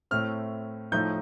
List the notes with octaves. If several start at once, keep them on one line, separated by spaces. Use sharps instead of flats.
A2 A3 C4 F6
A2 F3 A3 D#4 G6